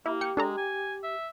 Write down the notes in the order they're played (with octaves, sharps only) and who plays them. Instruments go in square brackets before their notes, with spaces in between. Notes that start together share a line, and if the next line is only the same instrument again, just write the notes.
[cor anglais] A#3 [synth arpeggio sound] E4 [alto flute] G4
[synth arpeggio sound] G5 C#7
[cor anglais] G#3 [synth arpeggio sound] D4 A4 A#5
[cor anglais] G#5
E5